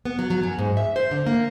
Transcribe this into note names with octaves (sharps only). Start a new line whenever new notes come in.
B3
F#3
F#3
F#2
G#2
E5
C5
D3
A#3